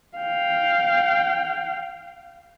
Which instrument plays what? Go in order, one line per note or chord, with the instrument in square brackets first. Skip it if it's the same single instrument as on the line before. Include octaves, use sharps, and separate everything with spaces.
[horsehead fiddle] F5 G5